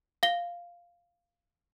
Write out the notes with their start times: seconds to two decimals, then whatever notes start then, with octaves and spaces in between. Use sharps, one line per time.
0.23 F5 G7